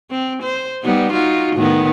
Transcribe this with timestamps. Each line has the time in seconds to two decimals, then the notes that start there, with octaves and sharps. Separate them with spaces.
0.10 C4
0.42 C5
0.83 G3 B3 D#4
1.12 D#4 F4 F#4
1.56 A2 D#3 B3